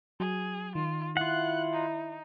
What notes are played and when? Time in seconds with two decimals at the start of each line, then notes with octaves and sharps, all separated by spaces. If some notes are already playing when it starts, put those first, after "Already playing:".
0.20 F#3 G#4
0.75 D#3 F4
1.17 E4 F4 F#5 F#6
1.73 D#4